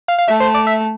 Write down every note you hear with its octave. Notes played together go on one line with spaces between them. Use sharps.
F5
F5
A3 E5
C5
D5
E5